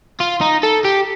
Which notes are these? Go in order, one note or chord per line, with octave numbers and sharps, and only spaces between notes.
F4
D#4
A4
G4